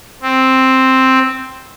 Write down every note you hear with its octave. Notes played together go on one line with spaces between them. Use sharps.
C4